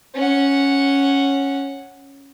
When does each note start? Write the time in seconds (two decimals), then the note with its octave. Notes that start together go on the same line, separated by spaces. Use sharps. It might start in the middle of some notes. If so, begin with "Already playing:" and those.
0.15 C#4 F#5